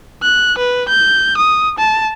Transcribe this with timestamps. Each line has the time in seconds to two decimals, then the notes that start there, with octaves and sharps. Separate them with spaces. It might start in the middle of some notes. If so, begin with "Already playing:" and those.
0.22 F#6
0.58 B4
0.88 G6
1.38 D#6
1.78 A5